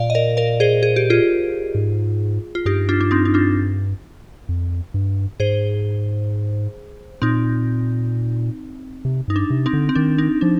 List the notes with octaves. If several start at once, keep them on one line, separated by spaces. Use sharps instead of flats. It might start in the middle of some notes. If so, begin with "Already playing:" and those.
Already playing: A#2 D5 F5
D#5
A#4 D5
A#4 D5
G#4 C5
G#4
G4
F4 G#4
G#2
F4
G2 D#4 G4
D4 F4
D4
C4 D#4
D#4
D4 F4
F2
G2
G#2 G#4 C5
A#2 C4 D#4
C3
G2 D#4
D4
C3
C4 D#4
D3
C4
D#3 D4
C4 D#4
F3 D4